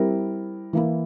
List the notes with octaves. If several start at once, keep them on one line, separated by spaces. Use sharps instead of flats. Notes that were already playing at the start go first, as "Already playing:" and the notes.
Already playing: G3 C4 E4 A#4
E3 A#3 E4